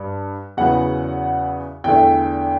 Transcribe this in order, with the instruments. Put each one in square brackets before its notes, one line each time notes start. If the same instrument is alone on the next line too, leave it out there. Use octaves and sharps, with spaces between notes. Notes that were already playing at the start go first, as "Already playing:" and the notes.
Already playing: [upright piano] G2
E2 C#3 F#3 B3 F#5
E2 D3 A3 G5